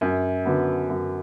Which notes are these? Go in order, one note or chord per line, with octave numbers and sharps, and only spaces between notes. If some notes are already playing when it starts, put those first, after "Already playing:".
F#2
D3 F#3 B3
F#2